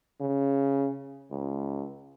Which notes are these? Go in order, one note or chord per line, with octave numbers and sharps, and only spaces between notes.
C#3
C#2